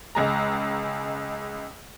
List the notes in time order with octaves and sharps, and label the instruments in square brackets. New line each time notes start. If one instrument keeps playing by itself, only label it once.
[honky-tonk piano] C#2 G#3 A#5